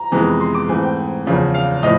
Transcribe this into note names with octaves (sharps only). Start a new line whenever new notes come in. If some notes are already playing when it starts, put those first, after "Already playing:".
Already playing: A#5
F2 C3 E3 G#3 B3
C6
D6
G#2 E3 A3 C4 G#5
G5
E2 C#3 F3
F5
A2 F3 D#5